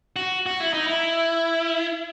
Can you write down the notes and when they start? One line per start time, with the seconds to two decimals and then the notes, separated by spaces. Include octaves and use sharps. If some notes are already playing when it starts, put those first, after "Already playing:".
0.16 F#4
0.46 F#4
0.60 E4
0.73 D#4
0.87 E4